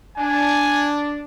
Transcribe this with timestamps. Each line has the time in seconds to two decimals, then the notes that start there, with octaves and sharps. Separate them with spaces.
0.18 D4 G#5